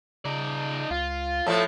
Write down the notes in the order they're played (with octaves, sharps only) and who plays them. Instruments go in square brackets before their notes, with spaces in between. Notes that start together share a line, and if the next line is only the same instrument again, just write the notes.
[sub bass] C#3 [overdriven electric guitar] D#4 D5
[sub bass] C#2 [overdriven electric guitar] F4
[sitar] A2 F3 A3 [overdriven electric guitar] A4